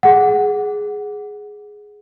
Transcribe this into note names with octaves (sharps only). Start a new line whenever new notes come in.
G#4 F#5